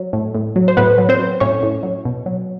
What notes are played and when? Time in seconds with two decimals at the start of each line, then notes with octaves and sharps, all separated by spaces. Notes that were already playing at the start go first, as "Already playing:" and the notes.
Already playing: F#3
0.13 A2
0.35 A2
0.56 F#3
0.68 C5
0.77 A2 B3 B4
0.98 F#3
1.09 C4 C5
1.19 F#3
1.40 A2 C#4 C#5
1.63 A2
1.83 F#3
2.05 B2
2.26 F#3